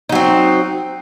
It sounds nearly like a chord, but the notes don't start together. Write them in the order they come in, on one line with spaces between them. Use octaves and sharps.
D#4 F#3 C4